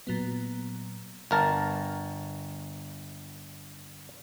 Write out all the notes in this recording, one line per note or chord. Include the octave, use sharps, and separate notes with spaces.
A#2 F#3 B3
G1 A#4 A5